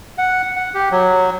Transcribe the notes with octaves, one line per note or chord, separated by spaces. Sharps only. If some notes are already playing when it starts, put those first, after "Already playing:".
F#5
F#5
G4
F#3